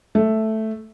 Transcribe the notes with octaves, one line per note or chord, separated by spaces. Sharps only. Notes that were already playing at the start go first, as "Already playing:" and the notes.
A3